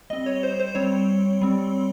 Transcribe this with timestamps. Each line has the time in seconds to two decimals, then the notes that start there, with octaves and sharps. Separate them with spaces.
0.10 G3 C4 D#5
0.26 C#5
0.43 C5
0.60 C5
0.75 G3 C4 C#5
1.41 G3 C4